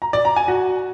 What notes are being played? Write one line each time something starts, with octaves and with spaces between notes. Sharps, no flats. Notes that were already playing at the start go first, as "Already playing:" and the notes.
A#5
D5
A#5
G#5
F#4